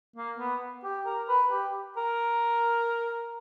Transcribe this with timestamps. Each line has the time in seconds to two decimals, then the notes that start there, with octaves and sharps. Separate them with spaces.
0.16 A#3
0.39 B3
0.84 G4
1.06 A#4
1.29 B4
1.52 G4
1.97 A#4